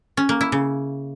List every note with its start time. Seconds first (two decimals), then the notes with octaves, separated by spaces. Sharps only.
0.17 C#4
0.29 A#3
0.41 E4
0.52 C#3